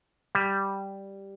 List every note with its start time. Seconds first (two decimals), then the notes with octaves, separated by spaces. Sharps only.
0.35 G3